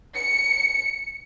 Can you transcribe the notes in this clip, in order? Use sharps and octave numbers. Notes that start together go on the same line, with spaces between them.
C#7